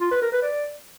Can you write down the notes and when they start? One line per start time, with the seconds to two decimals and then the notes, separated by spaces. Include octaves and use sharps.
0.01 F4
0.11 B4
0.22 A#4
0.32 B4
0.43 D5